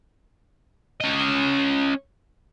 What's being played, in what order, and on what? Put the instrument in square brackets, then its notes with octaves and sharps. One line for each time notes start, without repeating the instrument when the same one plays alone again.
[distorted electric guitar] C#4 D#5